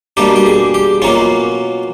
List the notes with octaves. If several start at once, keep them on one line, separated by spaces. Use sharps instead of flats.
B2 G3 A#3 D4 G4
G4
G#4
G4
B2 F#3 A#3 C#4 F4